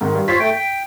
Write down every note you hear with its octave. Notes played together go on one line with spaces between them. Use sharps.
G#2 D#3
G2
F4 C5 C#5 B6
A3 G5
G5